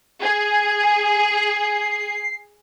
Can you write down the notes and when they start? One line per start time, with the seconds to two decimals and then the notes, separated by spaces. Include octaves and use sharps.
0.23 G#4 G#6
0.84 G#5
1.38 C7